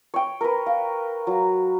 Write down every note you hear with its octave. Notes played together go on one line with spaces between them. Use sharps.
C#5 G5
A#4 B4
F5
F#3